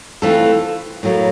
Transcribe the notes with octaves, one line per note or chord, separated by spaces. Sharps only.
E3 A3 C4 F4 A4
A2 F#3 A#3